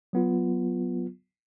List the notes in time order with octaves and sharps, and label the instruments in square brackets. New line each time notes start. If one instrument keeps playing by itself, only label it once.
[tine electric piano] F#3 B3 F4